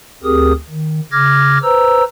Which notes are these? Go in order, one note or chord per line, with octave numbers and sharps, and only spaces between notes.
D2 C4 G4 G#4 A#4 D#6
D#3
C#3 D6 F6 G#6 A#6
B4 C5 A#5 E6